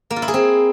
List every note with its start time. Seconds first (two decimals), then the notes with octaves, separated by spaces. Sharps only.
0.10 A#3
0.16 F4
0.22 E4
0.28 G#4
0.34 C4